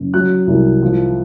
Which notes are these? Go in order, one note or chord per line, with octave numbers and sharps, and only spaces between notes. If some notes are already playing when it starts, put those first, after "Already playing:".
Already playing: F#1
F#3 F#6
C2
F3